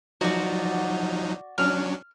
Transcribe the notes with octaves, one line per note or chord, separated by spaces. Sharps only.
F3 F#3 D#4 F#4 D5
F#3 C#4 D4 F6